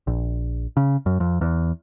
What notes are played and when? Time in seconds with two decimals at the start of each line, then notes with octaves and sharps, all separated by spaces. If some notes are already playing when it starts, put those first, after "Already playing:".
0.07 A#1
0.77 C#3
1.06 F#2
1.20 F2
1.41 E2